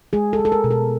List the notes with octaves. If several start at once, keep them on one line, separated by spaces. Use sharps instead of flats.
G#3 G#4
A4
G#3
A4
A#4
B2
A#4